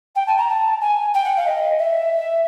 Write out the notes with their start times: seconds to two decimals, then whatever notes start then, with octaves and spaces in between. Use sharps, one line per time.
0.15 G5
0.26 A5
0.37 A#5
0.49 A5
0.81 G#5
1.14 G5
1.24 F#5
1.36 F5
1.46 D#5
1.78 E5